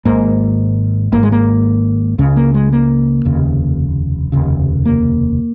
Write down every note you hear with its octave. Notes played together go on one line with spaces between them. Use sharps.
G#1 G#2 A#3
G#1 G#2 A#3
G#3
A#3
C#2 C#3 C#4
A#3
G#3
A#3
F1 D#2 C#3
F1 D#2 C#3
A#3